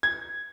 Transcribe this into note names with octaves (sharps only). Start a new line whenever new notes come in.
G#6